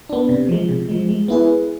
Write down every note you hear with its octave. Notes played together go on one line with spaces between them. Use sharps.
B3 D4
C3
F3 G#3
C3
F3 G#3
G#3
B3 E4 G#4 B4